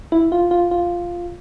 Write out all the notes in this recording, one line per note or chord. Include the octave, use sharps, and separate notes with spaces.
E4
F4
F4
F4